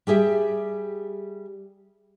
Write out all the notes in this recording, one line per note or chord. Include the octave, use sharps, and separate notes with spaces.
G3 G4 G#4 E5